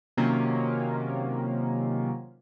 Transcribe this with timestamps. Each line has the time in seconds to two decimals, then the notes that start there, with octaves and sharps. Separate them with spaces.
0.17 C3 D#3 F#3 A#3 C#4 F4